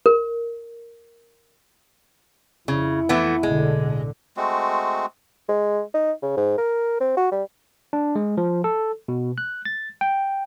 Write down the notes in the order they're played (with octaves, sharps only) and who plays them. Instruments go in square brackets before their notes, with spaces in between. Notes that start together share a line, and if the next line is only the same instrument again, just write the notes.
[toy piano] A#4
[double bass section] F2 [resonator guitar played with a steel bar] C#3 [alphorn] E4
[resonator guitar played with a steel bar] E3 A3 B3
[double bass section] B1 A2 D3 [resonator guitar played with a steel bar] G#3
[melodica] G#3 A3 C4 F#4
[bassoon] G#3
D#4
C#3
G#2
A#4
C4
F#4
G3
[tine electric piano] D4
G#3
F3
A4
B2
F#6
A6
G5